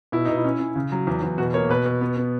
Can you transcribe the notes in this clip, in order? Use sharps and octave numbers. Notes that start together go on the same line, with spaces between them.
B2 E4
B2 D#4
E4
C#4
C#4
C#3
F#3
E2
E2
B2 F#4
A#3 C#5
B2 B4
B2
B3
B3